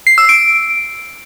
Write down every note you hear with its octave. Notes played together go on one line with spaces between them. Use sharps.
C7
E6
D7